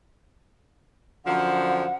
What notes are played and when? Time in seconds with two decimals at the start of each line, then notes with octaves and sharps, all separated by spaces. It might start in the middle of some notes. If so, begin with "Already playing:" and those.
1.26 F#2 D3 F3 F#5